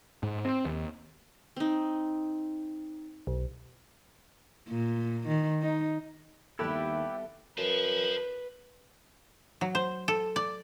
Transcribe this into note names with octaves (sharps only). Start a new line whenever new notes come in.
G#2
C4
D#2
C4 D#4
B1
A#2
D#3
D#4
D#2 G3 B3 E4 G4 A4 B4 E5
F#2 B4 C5 A5
F#3
C5
A4
D5